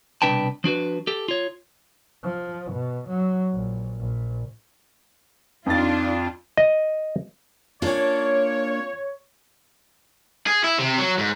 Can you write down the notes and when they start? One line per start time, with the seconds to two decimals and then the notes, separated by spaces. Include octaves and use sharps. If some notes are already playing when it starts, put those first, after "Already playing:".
0.22 C2 B2 D4 B4 G5 A5
0.64 F3 D4 F#4 B4
1.07 G4 A4
1.28 F4 C#5
2.24 F3
2.72 B2
3.09 F#3
3.53 A#1
4.00 A#1
5.66 F2 D4 D#4 F4 A6
6.57 D#5
7.82 A#3 C#4 D4 F4 C#5
10.47 G#4
10.64 E4
10.79 C3
10.98 F#3
11.18 G#2